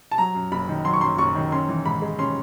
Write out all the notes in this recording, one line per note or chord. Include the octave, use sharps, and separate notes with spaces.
A5
F#3 A#5
F#2
F#1 B5
D#3
F#3 C6
C#6
F#2 C6
F#1 C#6
D#3
C#4 C6
E3
G#2 B5
G#3
C#4 C6